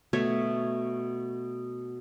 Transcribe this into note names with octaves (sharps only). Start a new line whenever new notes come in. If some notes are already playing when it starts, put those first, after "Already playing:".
B2 A3 C#5 E5